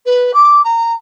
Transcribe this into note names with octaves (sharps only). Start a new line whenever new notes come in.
B4
D6
A#5